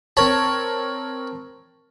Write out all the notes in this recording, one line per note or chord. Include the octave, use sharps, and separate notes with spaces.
C4 A#4 C#5 A5 B5